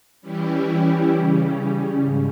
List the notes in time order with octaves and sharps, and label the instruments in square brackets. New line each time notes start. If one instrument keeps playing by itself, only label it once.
[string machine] E3 G3 C#4 E4 G4
C#3 G3 C#4
G#2